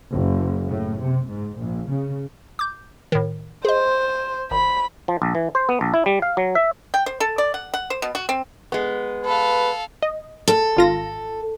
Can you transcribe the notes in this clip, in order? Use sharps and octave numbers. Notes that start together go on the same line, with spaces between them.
F#1
A2
C3
G#2
A#1
C#3
D6 G6
A2 D#3
G#4 C5 D#5
G#1 B5
F3
A#1
E3
C5
B3
A#1
E4
G3
F5
F#3
E5
G5
C5
A4
D5
F#5
F#5
C5
B2
F#4
C4
G#3 B3
A4 B4 F5
D#5
A4
G#1 F4 A#6